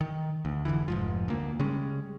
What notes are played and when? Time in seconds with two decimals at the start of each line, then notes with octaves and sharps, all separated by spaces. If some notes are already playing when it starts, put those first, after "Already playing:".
0.01 D#3
0.45 D2
0.65 F1 B1 D3 E3
0.88 F1 G#2 F3
1.28 D2 A#3
1.59 C#3 G3 G#3 C#4